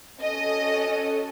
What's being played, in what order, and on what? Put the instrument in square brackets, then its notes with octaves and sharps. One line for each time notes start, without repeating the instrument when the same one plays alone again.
[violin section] C#4 F#4 A4 D#5